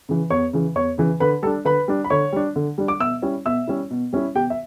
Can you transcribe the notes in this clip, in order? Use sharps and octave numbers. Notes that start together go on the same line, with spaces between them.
C#3 E3
E2 C#5 C#6
C#3 E3
E2 C#5 C#6
C#3 E3
D3 B4 B5
G3 D4 A4 A5
D3 B4 B5
G3 D4
B5
D3 C#5 C#6
G3 D4
D3
G3 D4
D6
B2 E5 E6
G3 C#4 E4
B2 E5 E6
G3 C#4 E4
B2
G3 C#4 E4
B2 G4 G5
E5